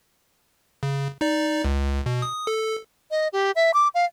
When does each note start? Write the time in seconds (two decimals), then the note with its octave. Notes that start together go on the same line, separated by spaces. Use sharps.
0.83 C#3
1.21 D#4 D5
1.64 C#2
2.06 B2
2.22 D#6
2.47 A4
3.11 D#5
3.33 G4
3.56 E5
3.74 D6
3.94 F5